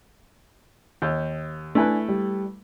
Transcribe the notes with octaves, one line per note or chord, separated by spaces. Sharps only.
D#2 G6
A3 D4 E4 B4 G#5
G3